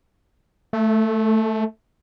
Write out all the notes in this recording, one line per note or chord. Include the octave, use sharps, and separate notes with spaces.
A3